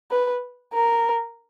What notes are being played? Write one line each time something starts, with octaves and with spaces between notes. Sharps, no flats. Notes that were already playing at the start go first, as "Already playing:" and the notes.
B4
A#4